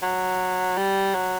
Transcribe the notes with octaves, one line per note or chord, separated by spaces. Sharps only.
F#3
G3
F#3